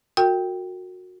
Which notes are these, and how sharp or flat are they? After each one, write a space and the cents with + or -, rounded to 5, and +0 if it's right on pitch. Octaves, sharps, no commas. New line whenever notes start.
F#4 -20 A#4 -35 G5 +0